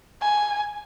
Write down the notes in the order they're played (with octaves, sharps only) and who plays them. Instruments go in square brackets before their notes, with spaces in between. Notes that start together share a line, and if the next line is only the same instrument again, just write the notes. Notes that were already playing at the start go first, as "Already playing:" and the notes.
[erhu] G#5